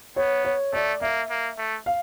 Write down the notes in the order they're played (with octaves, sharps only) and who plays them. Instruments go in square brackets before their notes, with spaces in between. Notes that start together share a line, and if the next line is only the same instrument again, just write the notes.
[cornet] B3 [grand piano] C#5
[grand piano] C#5
[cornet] A3 [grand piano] D5
[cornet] A#3 [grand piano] E5
[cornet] A#3
A3
[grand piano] F5